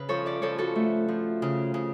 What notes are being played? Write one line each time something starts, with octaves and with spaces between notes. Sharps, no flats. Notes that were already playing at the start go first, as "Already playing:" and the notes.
Already playing: C#3 B4
F3 A4 C#5
B4 D5
F3 A4 C#5
F#4 A4
A3
F3
C#3
C#3